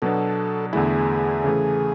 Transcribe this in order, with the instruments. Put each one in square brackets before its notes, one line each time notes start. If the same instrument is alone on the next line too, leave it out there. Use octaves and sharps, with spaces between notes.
[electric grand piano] B2 F#3 B3 D4 [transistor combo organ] A4
[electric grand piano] E2 D3 A3 E4 [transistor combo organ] G#4
[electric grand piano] C#3 E3 A3